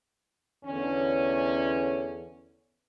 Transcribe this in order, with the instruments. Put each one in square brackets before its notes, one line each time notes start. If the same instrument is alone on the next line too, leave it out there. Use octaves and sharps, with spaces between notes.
[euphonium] E2 [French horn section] D3 C#4